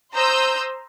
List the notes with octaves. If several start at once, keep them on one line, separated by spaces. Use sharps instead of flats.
C5 A#5 C6 D#6 E6 G6